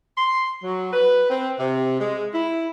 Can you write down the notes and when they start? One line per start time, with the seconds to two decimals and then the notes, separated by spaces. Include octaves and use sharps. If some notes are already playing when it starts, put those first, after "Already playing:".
0.17 C6
0.62 F#3
0.93 B4
1.30 C4
1.60 C3
2.00 G#3
2.34 E4